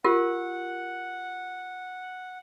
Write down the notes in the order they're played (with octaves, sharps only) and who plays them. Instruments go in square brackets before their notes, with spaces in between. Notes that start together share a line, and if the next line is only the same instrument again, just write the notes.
[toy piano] F4 G4 A#4 [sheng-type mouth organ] F#5